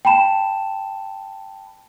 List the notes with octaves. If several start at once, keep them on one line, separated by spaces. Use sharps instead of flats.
G5 A5 B5 E7